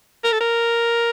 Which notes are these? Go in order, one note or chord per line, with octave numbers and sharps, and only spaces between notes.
A#4
A4
A#4